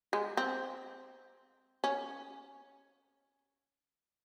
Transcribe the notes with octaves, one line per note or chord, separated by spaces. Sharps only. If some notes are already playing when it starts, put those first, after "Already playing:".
G#3
C4
C#4